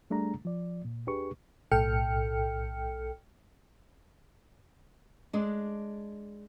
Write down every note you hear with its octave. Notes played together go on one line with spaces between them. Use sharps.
G3 A3 D4 G#4 A#5
F3 D5
A#2
D#2 D4 G4 G#4 B4 C#6
B1 A2 A4 G5 F6 C#7
G#3 D4